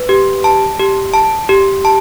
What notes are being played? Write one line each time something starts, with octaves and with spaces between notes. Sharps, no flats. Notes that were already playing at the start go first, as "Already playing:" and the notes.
Already playing: B4
G4
A5
G4
A5
G4
A5